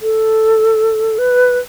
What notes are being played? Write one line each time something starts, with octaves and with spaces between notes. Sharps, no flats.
A4
B4